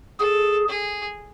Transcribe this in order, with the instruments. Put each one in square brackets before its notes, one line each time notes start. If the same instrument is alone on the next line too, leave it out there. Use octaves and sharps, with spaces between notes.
[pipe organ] G#4 [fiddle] A4
[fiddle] G#4